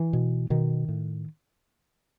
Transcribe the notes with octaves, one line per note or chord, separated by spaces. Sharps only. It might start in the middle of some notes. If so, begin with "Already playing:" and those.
Already playing: E3
B2
B2 D#3
A2